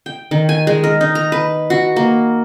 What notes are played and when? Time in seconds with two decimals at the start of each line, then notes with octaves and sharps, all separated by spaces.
0.06 G5
0.31 D#3
0.49 G#5
0.67 G#3
0.84 A#4
1.01 D#4
1.15 A#5
1.32 B4
1.70 F#4
1.96 A#3